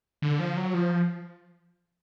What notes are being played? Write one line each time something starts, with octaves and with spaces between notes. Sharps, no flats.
D3
F3
F#3
F3